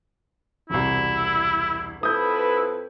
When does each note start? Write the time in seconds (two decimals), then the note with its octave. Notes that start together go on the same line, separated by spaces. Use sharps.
0.70 E1 C2 E4
2.03 F2 E4 A4 B4 D#6 G6